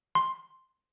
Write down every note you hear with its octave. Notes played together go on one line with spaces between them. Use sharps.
C6